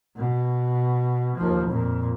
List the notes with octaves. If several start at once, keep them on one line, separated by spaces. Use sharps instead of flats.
B2
D#2 F3
F2 A#2